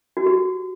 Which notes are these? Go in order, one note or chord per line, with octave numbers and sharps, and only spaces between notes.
F#4
G4